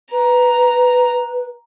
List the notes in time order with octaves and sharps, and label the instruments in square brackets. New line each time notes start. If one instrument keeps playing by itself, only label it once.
[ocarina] B4 [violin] A#5